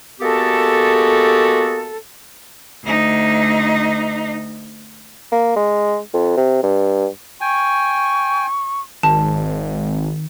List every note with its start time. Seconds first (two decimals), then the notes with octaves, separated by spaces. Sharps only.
0.20 G#3 A#3 B3 F#4 G4 A4
2.84 D2 D#4
5.32 A#3
5.56 G#3
6.14 F2
6.37 C3
6.63 G2
7.41 G5 G#5 C#6
9.03 G#1 D#3 A5